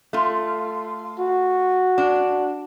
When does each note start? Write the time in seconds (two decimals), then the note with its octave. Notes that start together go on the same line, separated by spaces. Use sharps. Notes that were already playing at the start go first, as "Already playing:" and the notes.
0.13 A3 F4
1.19 F#4
1.98 D4